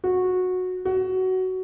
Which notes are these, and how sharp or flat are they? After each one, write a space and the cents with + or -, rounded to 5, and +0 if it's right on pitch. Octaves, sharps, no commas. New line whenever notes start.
F#4 -15
F#4 +15